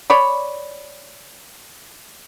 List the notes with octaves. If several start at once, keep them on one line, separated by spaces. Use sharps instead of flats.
C#5 D5 B5